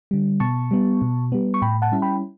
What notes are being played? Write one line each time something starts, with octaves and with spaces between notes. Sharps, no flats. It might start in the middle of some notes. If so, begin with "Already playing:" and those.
D3 G3
B2 A5 C#6
G3 B3
B2
G3 B3
C#6
A2 G5 B5
F#5 A5
G3 C#4 E4
G5 B5